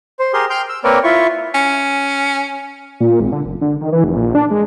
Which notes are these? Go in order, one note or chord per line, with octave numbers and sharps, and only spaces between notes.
C5
G4 G#4 A#4 C6
G5 C6 F6 G6
E6
A#3 C4 A#4 B4 C#5 D5
E4 F4 C#6
C#4
A#2
G#1
D3
F#1
D3
D#3
E3
F1
A#1
D4
G#3